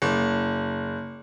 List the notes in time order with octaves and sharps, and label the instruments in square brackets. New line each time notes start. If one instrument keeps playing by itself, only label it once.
[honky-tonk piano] F#1